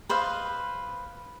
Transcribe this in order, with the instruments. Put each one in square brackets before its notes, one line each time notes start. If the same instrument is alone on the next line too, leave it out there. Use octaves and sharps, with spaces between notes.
[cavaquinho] B4 C5 D#5 F5